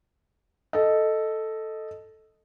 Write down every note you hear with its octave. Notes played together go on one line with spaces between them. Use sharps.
A4 D#5